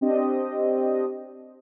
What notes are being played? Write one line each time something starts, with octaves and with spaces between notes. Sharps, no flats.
C4 D4 G4 D#5